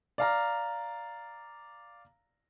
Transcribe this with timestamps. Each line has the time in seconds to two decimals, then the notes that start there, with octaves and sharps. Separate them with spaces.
0.18 D5 F5 A#5